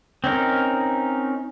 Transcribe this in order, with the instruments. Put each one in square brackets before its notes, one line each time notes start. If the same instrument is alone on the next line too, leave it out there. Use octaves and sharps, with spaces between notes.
[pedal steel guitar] C4 C#4 D#4 A#4